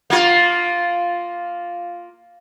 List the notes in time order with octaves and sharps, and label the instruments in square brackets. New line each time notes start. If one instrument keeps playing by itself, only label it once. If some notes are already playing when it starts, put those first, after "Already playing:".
[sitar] A#3 F4